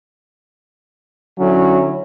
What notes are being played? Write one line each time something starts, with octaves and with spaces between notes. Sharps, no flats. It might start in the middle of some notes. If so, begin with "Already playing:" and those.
D3 F#3 C#4 E4